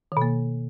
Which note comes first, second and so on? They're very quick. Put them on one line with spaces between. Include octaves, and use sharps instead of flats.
D#3 B2 A#3